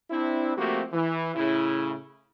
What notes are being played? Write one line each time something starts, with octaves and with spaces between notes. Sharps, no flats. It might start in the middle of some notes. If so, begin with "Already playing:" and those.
C4 D4 E4
F3 A3 A#3 C4 F#4 G4
E3
A2 C#3 E4